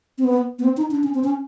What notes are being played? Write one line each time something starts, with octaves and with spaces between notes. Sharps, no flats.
C4
B3
B3
C4
D#4
D4
C#4
C4
C#4